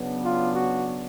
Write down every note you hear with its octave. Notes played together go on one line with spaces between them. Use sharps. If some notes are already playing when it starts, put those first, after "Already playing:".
Already playing: C#3 F#3 B3 D4
F4
F#4